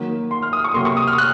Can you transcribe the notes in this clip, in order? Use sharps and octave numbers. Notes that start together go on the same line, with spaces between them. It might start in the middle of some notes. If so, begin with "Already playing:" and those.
Already playing: D#3 F#3 A#3
C6
F6
D#6
C#6
C3 F#3 A#3 C6
C#6
D#6
F6
F#6